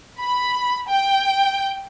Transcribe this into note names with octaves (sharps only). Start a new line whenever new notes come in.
B5
G5